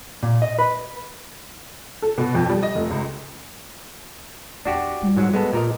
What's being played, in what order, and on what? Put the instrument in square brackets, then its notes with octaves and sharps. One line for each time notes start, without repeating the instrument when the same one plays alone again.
[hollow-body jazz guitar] A#2
D#5
B4
[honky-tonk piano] A4
B2
F2
G3
D#5
F1
C#2
[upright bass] E2 [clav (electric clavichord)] D4 F#4 G4
[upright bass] G3 F4
[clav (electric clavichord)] G#2 F#3
G#3 B3 A4
[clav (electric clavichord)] A#2 A#4 D#5 [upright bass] F3